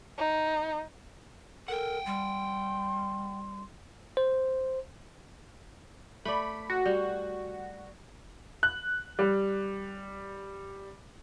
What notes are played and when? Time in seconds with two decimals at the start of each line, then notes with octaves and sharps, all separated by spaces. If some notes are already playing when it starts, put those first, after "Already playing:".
0.18 D#4
1.68 A4 A#4 F#5 G5
2.06 G3 C6
4.17 C5
6.25 A3 D5 B5
6.70 F#4
6.85 G3
8.63 F#6
9.19 G3